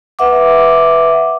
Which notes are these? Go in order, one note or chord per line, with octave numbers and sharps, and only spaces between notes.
B4 E5 F#5 D6